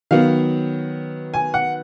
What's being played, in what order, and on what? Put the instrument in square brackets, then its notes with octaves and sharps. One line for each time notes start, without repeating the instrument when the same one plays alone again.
[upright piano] D#3 F#3 B3 F5
G#5
F#5